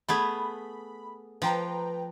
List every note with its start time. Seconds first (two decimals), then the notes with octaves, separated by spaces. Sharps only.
0.09 A3 B3 G#4 B5
1.42 F3 B4 G5 A#5